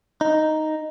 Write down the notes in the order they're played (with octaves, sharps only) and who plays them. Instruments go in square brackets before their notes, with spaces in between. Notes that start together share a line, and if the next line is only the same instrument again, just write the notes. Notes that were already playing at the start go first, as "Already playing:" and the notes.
[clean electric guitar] D#4